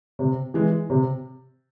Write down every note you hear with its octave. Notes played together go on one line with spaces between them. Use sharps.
C3
E3 G#3
C3